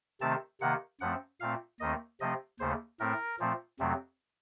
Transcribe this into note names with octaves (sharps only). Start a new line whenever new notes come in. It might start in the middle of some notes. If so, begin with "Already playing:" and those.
C3 D#3 A3 C4 A5
C3 D#3 A#3 F#5
F#2 F3 A3 C4 F#5
A#2 A3 C4 F5
D#2 D#3 A3 C4 D#5
C3 F3 A3 C4 D#5
D#2 C#3 A3 C5
A2 A3 C4 A#4
A#2 F3 A3 C4
F2 C3 F#3 A3 C4